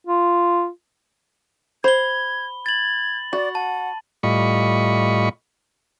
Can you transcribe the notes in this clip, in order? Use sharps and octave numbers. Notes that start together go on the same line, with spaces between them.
F4
C5 B5 G#6 G7
G#6 A6 F#7
F#4 D5
F#5 A5
A2 G3 F4 D#5 B5 C#6